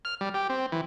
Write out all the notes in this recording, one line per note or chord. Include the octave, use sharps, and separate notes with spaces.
F6
G3
G4
C4
E3